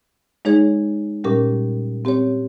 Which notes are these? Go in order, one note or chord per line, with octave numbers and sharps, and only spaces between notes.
G#3 D#4 G#4 C#5
A#2 G3 C#4 G4 A#4
C4 G4 C#5